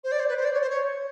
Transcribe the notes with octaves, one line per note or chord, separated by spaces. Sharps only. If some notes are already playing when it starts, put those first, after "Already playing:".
C5
D5
C5
B4
C5
D5
C#5
C5
C#5